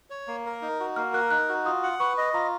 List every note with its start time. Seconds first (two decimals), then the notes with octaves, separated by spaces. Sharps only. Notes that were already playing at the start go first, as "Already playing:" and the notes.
0.10 C#5
0.28 A#3
0.46 A#4
0.62 D#4
0.80 F#4
0.96 A#3 F6
1.13 A#4 F#6
1.30 D#4 F#6
1.49 F#4
1.65 F4 D#6
1.83 F#5
2.00 B4 C#6
2.18 D#5
2.34 F4 A#5